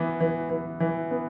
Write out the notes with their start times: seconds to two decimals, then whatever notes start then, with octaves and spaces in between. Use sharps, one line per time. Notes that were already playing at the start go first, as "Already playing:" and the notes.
Already playing: E3 B3 E4
0.20 E3
0.50 E3
0.80 E3
1.11 B3